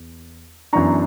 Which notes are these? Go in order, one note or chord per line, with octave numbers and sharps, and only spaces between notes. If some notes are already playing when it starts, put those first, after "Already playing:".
Already playing: E2
F#2 E3 B3 D4 A#5 C#6